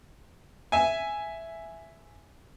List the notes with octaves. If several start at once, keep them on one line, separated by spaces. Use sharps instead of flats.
E5 G#5